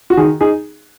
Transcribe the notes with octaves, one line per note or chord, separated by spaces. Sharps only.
F#4
D#3 G#4
D#4 G#4